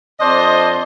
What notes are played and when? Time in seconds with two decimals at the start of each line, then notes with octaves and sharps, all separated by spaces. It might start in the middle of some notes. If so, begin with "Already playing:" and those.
0.19 F2 D4 C5 D#5